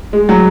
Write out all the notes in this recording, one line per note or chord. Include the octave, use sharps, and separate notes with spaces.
G#3
F#3